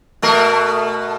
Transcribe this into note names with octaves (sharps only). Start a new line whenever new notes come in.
B2 A3 A#4